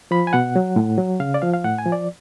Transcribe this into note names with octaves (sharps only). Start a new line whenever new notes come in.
F3 B5
G#5
B2 F#5
F#3
A2
F#3
C#3 F5
D5
F3 F5
F5
A2 F#5
G#5
F3
D5